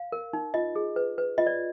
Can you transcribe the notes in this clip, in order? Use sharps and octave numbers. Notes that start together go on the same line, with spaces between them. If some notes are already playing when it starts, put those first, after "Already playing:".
Already playing: F5
A#4
D#4
F4 D#5
G#4
B4
B4
F4 D#5
D5